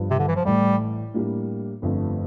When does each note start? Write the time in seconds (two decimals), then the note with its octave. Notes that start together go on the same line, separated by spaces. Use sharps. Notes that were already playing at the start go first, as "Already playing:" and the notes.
Already playing: G1 G2 F3
0.11 C3
0.19 D3
0.28 E3
0.36 F3
0.45 A1 A2 E3 G3 A3
1.14 A2 G3 A#3 D4
1.82 G1 F2 D3 F3 A3